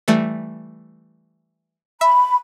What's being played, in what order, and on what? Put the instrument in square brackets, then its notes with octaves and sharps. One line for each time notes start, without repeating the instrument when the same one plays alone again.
[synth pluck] E3 G3 A3
[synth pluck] E5 [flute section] B5